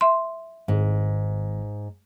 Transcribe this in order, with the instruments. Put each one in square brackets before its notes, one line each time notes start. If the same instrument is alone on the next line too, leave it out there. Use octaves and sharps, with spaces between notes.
[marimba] E5 C6
[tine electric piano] G#1 [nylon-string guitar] G#2